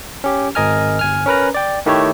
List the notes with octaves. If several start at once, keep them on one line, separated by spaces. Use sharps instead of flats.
C#4 G4
G#1 A#4 D#5 G#5 F6
G1 G#5 F6
C#4 A#4 B4 A#5
D5 G5
D#3 A3 E4 G4 A4 C#5